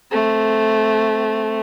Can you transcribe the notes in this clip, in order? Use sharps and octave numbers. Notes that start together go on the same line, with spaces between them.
A3 C4